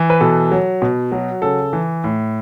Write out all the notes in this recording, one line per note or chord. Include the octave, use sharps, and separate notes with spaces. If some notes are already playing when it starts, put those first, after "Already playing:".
Already playing: E3
B4
B2 A4
F#3
B2
F#3
C#3 A4
E3
A2